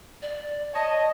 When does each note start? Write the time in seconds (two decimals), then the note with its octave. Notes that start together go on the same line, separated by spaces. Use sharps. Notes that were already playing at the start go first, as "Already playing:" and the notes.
0.22 D5
0.74 C#5 D#5 A5